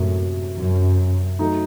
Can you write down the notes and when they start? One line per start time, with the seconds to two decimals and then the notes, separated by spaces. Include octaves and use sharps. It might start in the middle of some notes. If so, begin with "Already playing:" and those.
Already playing: F#2 A2 C3 F#3 A#3
0.57 F#2
1.39 F#3 A3 D#4